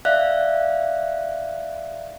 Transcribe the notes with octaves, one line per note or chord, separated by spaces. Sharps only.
D5 E5 F5 F#6